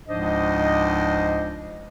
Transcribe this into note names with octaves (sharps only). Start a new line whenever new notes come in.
C#2 G#2 F3 D4 C5 D#5